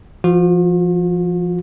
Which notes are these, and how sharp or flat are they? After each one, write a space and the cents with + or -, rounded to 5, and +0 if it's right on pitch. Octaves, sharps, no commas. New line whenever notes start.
F3 -20 F4 +45